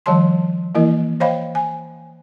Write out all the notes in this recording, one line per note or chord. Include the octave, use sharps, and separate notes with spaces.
D#3 F3 G3 C#5 A5 C6
E3 A#3 E4 A#4 D#5
C5 C#5 D#5 F5 G5 B5
G#5